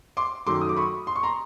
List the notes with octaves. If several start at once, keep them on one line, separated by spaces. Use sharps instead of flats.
C6 D6
F#2 D#3 F#3 A3 C6 D6
D#6
D6
B5 C#6
C6
C#6
A#5 C6